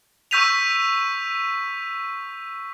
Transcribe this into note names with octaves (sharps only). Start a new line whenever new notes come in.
C#6 E6 G6 B6 D#7 F7